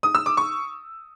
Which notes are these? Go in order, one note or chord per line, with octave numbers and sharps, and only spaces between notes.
D#6
E6
D6
C#6